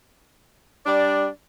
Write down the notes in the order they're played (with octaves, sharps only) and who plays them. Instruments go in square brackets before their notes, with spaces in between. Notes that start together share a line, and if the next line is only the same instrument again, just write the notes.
[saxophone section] G3 D4 D5